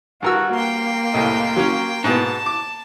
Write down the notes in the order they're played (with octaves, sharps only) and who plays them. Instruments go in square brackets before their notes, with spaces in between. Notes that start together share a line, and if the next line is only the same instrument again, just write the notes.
[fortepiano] G2 A#4 E6 [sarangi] F#4
[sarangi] A#3 [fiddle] G5 C6
[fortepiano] C2 A2 D#5
F#3 C#4
[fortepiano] G#2 B2 B3 [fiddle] A5
[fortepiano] D6